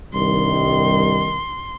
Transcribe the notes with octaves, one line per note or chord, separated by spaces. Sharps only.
C2 G2 D#3 C6